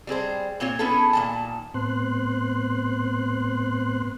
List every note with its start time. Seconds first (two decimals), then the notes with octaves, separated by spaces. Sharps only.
0.07 G3 C4 G#4 C5
0.60 A#2 C4 F4 C#5
0.79 B2 B3 C#4 E4 G#4 A4
1.13 A#2 D#3 A5
1.74 A2 B3 C4 C6 F#6